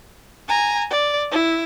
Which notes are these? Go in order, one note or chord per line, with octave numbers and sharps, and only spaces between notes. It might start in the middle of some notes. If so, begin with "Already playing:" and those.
G#5 A#5
D5
E4